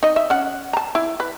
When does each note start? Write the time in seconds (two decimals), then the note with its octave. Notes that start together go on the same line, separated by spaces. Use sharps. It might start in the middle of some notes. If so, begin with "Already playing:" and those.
0.03 D#4 D#5
0.16 E5
0.30 C#4 F#5
0.73 A5 A#5
0.95 E4
1.20 B4